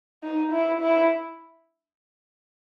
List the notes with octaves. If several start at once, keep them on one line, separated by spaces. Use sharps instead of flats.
D#4
E4
E4